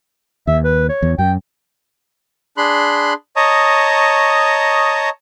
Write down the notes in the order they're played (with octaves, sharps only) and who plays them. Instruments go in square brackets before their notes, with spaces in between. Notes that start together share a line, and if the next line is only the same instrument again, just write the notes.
[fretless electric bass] D#2 [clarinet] E5
[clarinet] B4
C#5
[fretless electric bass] E2
[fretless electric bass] F#2 [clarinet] G5
[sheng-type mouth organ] D4 G#4 B5 C6 F#6
C#5 D#5 A5 A#5 C#6 D#6